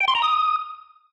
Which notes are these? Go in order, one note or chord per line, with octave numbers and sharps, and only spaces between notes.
G5
C6
A#5
D#6